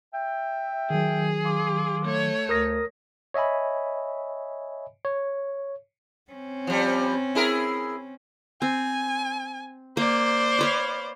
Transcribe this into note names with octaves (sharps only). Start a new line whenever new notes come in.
E5 G5
D#3 F#3 G#4
F5 C6 D6
A3 C#5
D2 A#4 D#6 A#6
C#5 D#5 E5 G#5 B5
C#5
C4 C#4
F3 G3
E4 G#4 A#4
C4 G#5
A#3 C5 D5
B4 C#5 F5